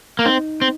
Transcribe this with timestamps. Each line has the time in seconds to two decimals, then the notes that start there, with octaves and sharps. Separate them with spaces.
0.19 A#3
0.25 C4 D#4
0.62 C4